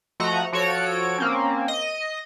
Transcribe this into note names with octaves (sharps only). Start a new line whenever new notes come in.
F3 A3 F#4 D#5 F#5 A#5
F3 F#4 A4 C#5 D7
A#3 C4 C#4
D#5